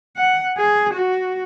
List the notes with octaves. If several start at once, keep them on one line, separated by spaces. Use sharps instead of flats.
F#5
G#4
F#4